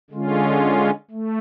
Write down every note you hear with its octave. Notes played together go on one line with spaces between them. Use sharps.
D3 G#3 C#4 F4
A3